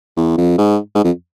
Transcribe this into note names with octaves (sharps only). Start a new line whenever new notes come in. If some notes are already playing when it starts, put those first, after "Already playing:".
E2
F2
G#2
G#2
F2